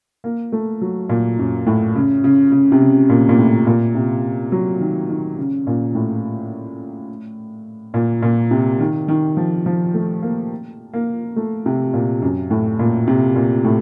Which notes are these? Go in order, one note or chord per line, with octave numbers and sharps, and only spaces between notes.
A#3
A3
F#3
A#2
F#2
A2
C#3
C#3
C#3
C3
C#3
A#2
A#2
A2
A#2
C3
F#3
D#3
D#3
C#3
A#2
A2
A#2
A#2
C3
D#3
D#3
F3
F3
A3
A#3
A#3
A3
C3
A#2
F#2
A2
A#2
C3
A#2
A2